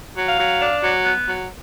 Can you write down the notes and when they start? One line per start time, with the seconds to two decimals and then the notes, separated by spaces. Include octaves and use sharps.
0.16 F#3
0.27 F5
0.38 F#3
0.61 D4
0.83 F#3
1.05 B3
1.28 F#3